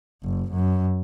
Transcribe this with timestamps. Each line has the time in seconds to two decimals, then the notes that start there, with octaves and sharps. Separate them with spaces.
0.24 F#1
0.52 F#2